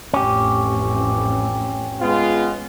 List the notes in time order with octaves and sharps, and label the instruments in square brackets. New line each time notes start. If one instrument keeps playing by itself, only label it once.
[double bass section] A1 F2 [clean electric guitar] C#4 G4
[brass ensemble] G#3 B3 F4